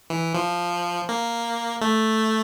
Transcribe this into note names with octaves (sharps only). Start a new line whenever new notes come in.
E3
F3
A#3
A3